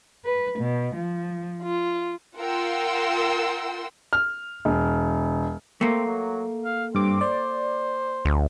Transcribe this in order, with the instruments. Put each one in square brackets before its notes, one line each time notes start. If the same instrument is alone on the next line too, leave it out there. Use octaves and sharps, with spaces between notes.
[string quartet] B4
B2
F3
F4
[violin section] F4 A#4 F#5 G5 C6 E6
[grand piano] F6
E1
[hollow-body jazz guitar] A3 A#3 [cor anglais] C4
[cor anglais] F#3
F5
[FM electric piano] G2 D6 [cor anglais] C4
[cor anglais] C5 [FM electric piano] D5
[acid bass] D2